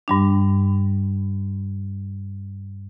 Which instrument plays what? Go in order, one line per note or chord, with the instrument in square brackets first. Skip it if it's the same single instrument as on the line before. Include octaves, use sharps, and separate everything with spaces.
[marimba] G2 G3 D4